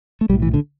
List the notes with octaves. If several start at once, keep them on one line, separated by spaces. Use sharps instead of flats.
A3
B1 A2 G3
E3
D3